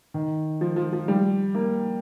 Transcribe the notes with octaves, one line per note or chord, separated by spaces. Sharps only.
D#3
F3
F3
F3
G3
A#3